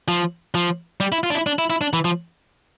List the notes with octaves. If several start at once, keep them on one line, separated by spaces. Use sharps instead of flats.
F3
F3
G3
E4
F4
D4
E4
D4
E4
E4
D4
E3
F3